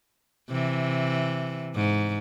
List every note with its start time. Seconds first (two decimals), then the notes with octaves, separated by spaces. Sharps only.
0.50 C3 E3
1.75 G#2